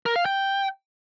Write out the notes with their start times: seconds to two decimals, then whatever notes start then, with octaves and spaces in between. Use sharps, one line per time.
0.06 A#4
0.16 F5
0.26 G5